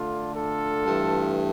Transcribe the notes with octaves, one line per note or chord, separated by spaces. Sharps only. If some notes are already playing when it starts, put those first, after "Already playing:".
Already playing: D3 A3 D4 F4
F4 A4
G2 E3 A3